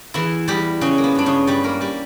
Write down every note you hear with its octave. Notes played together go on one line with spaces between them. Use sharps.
E2 E3 E4
E2 G3 G4
C#3 F#3 C#4
A#3
B3
G2 D4
C#3 C#4
G2 G3 G4
A#3 A#4
G3 G4